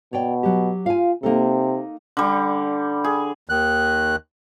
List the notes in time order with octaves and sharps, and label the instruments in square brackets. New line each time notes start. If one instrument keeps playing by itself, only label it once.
[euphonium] B2 [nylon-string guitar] C#5 D5 G5
[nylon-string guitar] F#3 G4
[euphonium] F4 [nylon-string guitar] F5 G#5
[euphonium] C3 [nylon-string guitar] A#3 D#4 A4
[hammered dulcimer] D3 G3
G#4
[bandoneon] D#2 D#3 F#6